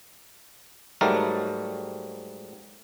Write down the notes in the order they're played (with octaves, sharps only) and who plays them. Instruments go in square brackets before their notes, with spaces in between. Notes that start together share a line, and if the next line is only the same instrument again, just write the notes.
[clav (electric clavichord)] G#2 F#3 G3 A3 A#4 D5